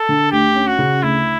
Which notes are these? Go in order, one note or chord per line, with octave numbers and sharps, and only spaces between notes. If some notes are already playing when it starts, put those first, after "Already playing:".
Already playing: A4
D3
D2 G4
C#4
F#4
C#3
D2 E4